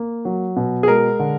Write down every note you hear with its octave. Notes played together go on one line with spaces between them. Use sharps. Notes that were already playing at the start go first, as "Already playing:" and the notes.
Already playing: A#3
F#3
B2
G#4
G#3 A#4
D3